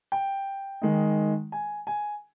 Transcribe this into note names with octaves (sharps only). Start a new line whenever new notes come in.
G5
D#3 G#3 D#4
G#5
G#5